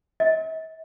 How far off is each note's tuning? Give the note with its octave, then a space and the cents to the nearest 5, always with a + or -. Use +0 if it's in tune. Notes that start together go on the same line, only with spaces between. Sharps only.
E5 -45